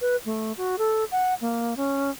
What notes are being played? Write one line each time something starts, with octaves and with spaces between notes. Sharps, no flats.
B4
A3
F#4
A4
F#5
A#3
C#4